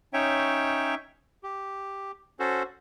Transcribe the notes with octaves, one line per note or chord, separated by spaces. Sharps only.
C#4 D#4 C#5 E5 G5
G4
C#4 F#4 A4 C5